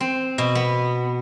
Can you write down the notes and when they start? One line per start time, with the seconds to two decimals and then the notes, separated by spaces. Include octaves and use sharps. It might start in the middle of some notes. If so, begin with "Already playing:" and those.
0.01 C4
0.38 B2
0.55 B3